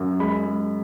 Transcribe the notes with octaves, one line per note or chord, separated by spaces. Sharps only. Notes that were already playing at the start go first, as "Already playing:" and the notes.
Already playing: F#2
G#3 B5
G#3